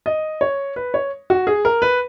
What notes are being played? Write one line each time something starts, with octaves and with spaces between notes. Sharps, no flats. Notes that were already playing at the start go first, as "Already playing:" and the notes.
D#5
C#5
B4
C#5
F#4
G#4
A#4
B4